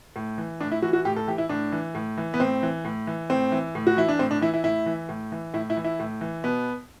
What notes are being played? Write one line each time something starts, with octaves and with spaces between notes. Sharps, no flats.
A2
E3
A2 D4
E4
E3 F#4
F#4
A2 G4
A4
E3 G4
E4
A2 D4
E3
A2
E3
B3
A2 C4
E3
A2
E3
A2 C4
E3
A2
F#4
E3 E4
D4
A2 C4
D4
E3 E4
E4
A2 E4
E3
A2
E3
A2 E4
E4
E3
E4
A2
E3
B2 B3